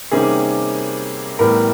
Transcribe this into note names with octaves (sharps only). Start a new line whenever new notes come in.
C3 D#3 G3 A#3 C#4 G#4
A2 E3 G3 B3 A#4